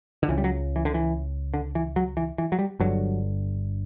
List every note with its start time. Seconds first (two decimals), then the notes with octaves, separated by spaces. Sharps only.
0.23 D3
0.29 C#2 C#3 E3
0.38 G3
0.44 F#3
0.76 E3
0.85 D3
0.94 E3
1.54 D3
1.75 E3
1.96 F#3
2.17 E3
2.38 E3
2.52 F#3
2.59 G3
2.79 G1 G2 D3 F#3